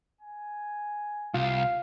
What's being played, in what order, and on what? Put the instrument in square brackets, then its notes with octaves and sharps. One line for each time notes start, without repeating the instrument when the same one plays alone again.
[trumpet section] G#5
[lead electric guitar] C2 [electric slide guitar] F4 [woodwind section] F5